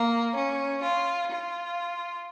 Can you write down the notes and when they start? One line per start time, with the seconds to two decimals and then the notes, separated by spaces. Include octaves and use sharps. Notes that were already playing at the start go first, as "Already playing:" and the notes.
Already playing: A#3
0.34 C#4
0.82 F4
1.30 F4